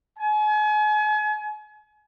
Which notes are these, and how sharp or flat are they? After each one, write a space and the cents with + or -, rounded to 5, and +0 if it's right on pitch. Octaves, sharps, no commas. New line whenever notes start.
G#5 +35